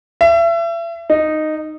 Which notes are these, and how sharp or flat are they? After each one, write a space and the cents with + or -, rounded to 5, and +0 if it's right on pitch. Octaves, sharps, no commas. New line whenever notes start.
E5 +35
D#4 -10